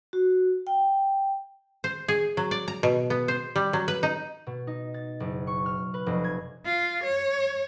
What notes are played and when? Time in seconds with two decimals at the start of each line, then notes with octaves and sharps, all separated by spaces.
0.13 F#4
0.67 G5
1.84 C5
2.08 G#4
2.37 F#3
2.51 D5
2.68 A#5
2.83 B2
3.10 B3
3.28 C5
3.56 G3
3.73 F#3
3.88 B4
4.03 D#4
4.47 B2
4.67 D#4
4.94 A6
5.20 F#1
5.47 C#6
5.66 F6
5.94 B4
6.06 F1
6.24 G#6
6.65 F4
7.03 C#5